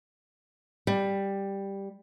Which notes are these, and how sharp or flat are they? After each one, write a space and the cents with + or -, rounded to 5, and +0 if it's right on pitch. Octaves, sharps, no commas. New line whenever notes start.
G3 +5